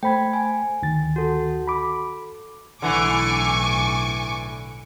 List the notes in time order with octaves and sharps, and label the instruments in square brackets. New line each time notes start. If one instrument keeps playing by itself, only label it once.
[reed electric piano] A3 C5 B5 [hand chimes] G5 G#6
[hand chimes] G#5
[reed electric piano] D2 D#3 A6
[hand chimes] F#4 A4
[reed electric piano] B5 D6
[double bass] B1 A2 [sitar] D3 E3 [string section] G#5 C#6 D6